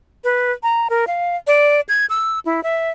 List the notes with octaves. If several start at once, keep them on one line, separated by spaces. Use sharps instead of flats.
B4
A#5
A#4
F5
D5
G#6
E6
E4
E5